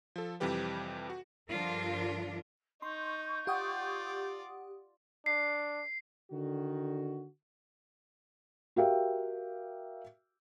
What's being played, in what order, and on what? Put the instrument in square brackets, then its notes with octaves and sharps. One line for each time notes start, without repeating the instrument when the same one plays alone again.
[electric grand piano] F3 A4
F2 C3 E3 G3 G4 B4
F#4
[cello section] G2 D3 F3 D4 F4 A#4
[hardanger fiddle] D#4 [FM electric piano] C6 [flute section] C#6 G6
[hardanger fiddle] F4 D5 [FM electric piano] G4 F#5 D#6
[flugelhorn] D4 [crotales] C7
[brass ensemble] D3 D#3 F#4
[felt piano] F#4 G4 A#4 E5 F5 G5